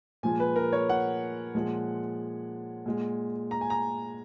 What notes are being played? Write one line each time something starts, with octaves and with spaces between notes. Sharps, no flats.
A#2 F3 G#3 G#5
B4
A#4
C#5
F#5
A#2 F3 G#3
A#2 G#3
A#5
G#5
A#5